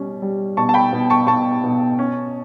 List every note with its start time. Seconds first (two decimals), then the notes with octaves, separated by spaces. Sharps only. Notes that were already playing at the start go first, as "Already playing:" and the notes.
Already playing: B2 G3 C#4
0.22 G3
0.57 B2 A5 C#6
0.69 A5
0.74 G5 B5
0.93 B2
1.10 A5 C#6
1.27 B2 A5 C#6
1.64 B2
1.99 C#4